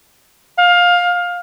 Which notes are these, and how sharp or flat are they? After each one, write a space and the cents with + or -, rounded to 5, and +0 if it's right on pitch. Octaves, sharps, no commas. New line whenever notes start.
F5 +20